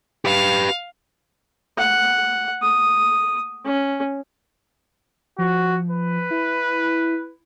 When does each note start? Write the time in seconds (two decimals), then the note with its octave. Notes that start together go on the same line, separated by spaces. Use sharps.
0.25 G4 B4 F5
1.78 F#5
2.62 D#6
3.65 C#4
5.39 F3 F#4
5.90 B4
6.31 E4